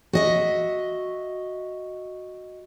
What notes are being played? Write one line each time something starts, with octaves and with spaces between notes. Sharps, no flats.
F#4 D#5 E5